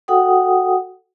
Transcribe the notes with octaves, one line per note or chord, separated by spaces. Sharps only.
F#4 A4 F#5 G5 D#6